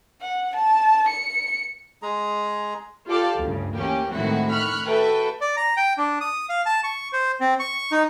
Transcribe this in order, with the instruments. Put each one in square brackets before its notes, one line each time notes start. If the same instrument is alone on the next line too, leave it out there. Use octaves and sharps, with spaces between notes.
[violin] F#5
A5
C#7
[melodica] G#3 G#4 A#5
[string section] F4 G4 A4 D5 F5
D2 G2 C#3
E3 A#3 C#4 G4
A2 D#3 G#3 C4 E4 F#4
B5 C#6 F6 F#6
F#4 A4 B4 E5 G5
[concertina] D5
A#5
G5
D4
D#6
F5
A5
C#6
C5
C4
C#6
D#4